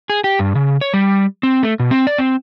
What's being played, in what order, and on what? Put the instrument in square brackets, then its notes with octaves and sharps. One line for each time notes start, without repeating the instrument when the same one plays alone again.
[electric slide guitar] G#4
G4
G2
C#3
C#5
G3
C4
A3
B2
C4
D5
C4